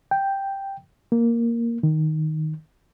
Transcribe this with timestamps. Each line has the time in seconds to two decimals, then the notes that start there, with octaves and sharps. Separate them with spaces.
0.11 G5
1.12 A#3
1.83 D#3